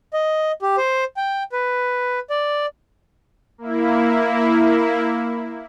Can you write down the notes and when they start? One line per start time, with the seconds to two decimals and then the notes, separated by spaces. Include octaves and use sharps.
0.13 D#5
0.62 G4
0.77 C5
1.17 G5
1.52 B4
2.30 D5
3.58 A#3 E4